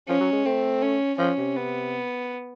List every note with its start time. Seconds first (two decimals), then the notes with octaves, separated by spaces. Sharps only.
0.08 F3 C#4
0.20 F#3
0.33 G#3
0.46 A3 C4
0.83 C#4
1.19 F3 C#4
1.38 C3
1.56 B3